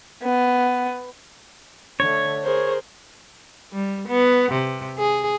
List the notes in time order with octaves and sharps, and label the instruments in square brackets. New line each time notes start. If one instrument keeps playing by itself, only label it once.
[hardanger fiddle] B3
[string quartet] D3 A3 [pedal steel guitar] C#5
[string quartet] G#4 A#4 C5
[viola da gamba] G3
B3
C3
G#4